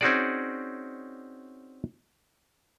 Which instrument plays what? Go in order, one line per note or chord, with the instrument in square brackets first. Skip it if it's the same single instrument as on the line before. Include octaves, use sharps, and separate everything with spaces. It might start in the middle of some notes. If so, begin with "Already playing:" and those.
[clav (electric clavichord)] C4 C#4 D#4 F#4 G#4 D5